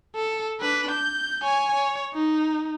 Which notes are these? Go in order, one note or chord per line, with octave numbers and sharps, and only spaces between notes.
A4
D4 B4
G6
C#5 G#5
C#5
D#4